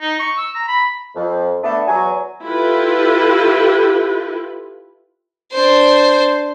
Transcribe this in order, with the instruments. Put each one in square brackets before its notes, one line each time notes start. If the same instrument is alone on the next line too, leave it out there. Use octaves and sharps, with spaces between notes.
[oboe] D#4
C#6
E6
A#5
B5
[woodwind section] F2
A3 B3 D4
E2 F#3 G#5
[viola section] E4 F4 G4 A4 B4
[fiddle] D4 C5